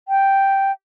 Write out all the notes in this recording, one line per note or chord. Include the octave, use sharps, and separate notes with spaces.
G5